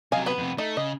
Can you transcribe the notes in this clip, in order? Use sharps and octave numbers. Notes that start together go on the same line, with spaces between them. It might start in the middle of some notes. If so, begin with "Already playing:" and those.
C3 F#3 D#5 F5 G#5
B3 B4
F2 C3
A3 D#4
C#3 D#5